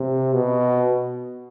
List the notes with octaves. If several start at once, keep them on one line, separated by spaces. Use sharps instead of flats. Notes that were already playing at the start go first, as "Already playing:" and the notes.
Already playing: C3
B2